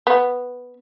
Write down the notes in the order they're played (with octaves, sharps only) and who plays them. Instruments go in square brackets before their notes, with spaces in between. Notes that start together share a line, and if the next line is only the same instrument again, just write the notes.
[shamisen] B3